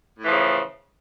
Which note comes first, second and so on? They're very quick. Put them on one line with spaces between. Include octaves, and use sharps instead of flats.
A2 E3 F3 C#3